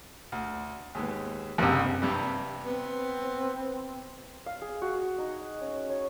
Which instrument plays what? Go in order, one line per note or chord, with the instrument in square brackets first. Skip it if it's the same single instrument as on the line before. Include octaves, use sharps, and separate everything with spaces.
[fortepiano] D2
D#2 G#2 B3
[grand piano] F#1 C3 [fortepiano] C2 G2
[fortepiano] G2 C3 G3
[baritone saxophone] B3 [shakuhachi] C4
[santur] F5
G#4
F#4
D#4
C#4
C#5